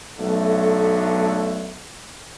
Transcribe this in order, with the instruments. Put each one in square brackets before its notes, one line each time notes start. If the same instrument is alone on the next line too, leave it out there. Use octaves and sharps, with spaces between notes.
[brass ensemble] B1 D3 F#3 A3